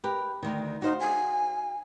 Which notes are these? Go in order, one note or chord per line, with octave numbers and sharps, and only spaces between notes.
G4 A#4 B4
D2 D#3
D#4 F#4 C5 F5
G#5